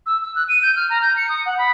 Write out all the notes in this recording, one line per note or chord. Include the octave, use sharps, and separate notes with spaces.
E6
E6
F#6
D#7
G6
F6
A#5
G6
C#7
D#6
F#5
B5